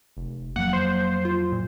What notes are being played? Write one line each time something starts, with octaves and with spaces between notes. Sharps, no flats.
F1
F2 F3 F#3 A#3 F#5
C5
F4
A#2